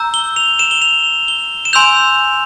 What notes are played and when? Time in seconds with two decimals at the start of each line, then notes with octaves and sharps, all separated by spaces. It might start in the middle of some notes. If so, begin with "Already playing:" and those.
Already playing: A#5 E6 G6
0.14 G7
0.36 F7
0.59 E7
0.71 G7
0.82 F7
1.28 G7
1.65 E7
1.73 G#5 C6 E6 G6 F7